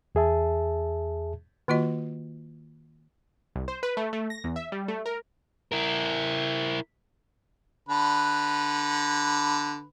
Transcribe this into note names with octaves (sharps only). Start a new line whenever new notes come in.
E2 G#4 E5 A5
D#3 A#3 F4 F#4 D#5
C2
C5
B4
A3
A3
A#6
E2
E5
G3
A3
A#4
E4 A#4
D3 B4